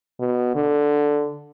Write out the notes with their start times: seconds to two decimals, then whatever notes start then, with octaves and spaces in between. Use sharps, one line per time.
0.20 B2
0.55 D3